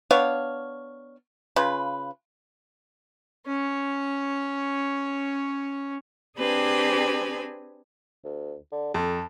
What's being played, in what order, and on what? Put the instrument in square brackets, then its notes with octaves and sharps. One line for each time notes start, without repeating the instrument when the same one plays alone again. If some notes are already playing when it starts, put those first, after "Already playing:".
[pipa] B3 D4 C#5 F5
C#3 F4 B4
[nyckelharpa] C#4 C#5
[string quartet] C4 D4 G4 G#4 B4 G#5
[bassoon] D2
D3
[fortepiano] F2 [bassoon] A4